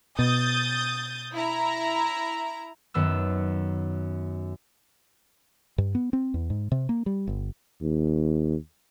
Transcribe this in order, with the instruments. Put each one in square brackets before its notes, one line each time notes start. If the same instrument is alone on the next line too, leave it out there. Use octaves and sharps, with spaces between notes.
[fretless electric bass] B2 [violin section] D#6 G6 A6
[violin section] E4 A#5
[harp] F#2 D#3 B3 E6
[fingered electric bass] G2
B3
C4
E2
G#2
C3
A#3
G3
G1
[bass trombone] D#2